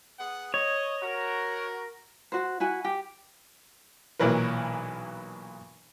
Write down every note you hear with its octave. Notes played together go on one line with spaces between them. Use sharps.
B3 G#4 F#5
C#5 D#5
F#4 A#4
F#4 C5
E4 F#4 G#5
G4
B1 A#2 E3 F#3 A#4 B4